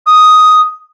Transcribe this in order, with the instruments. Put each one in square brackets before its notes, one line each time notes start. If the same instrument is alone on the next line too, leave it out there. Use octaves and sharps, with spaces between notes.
[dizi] D#6